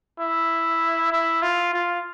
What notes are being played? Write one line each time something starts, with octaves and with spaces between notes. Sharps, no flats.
E4
E4
F4
F4